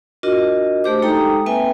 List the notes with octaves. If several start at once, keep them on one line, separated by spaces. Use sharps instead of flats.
D4 F4 F#4 A#4 D#5
A3 D4 G4 C5 D6
G#3 D#4 A4 G5 A#5 D#6
A#3 C4 B4 E5 G5 G#5